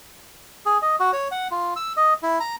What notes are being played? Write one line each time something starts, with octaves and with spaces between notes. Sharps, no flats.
G#4
D#5
F#4
C#5
F#5
F4
E6
D#5
E4
A#5